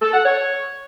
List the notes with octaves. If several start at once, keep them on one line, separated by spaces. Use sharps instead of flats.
A4
F#5
C#5